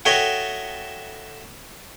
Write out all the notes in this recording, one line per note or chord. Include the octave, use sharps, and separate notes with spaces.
F#4 A4 C#5 D#5 E5 G5